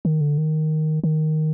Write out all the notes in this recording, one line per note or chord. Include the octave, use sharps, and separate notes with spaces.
D#3
D3
D#3
D#3